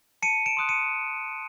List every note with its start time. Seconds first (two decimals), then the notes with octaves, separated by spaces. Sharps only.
0.22 A5 C#7 D#7
0.46 D7 E7
0.57 C6 D#6 F#6
0.69 C#7 D#7